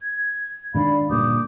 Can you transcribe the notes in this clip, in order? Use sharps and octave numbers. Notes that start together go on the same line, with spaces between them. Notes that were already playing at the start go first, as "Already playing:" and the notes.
G#6
G#2 D#3 D4 D5 F5 B5
D2 G2 A#2 D6 D#6 G6